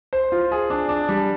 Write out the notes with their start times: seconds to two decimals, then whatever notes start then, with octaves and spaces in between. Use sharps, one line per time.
0.13 C5
0.32 F4
0.52 G#4
0.70 D4
0.89 D4
1.09 G3